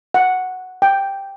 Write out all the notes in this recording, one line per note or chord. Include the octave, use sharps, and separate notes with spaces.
F#5
G5